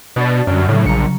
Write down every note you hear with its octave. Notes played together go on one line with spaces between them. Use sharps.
B2 D4 D5
G1 F#2 G5 F6
A2 C#3 F#3
A#1 A#5 C#7